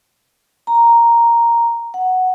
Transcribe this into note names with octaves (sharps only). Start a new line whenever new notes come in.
A#5
F#5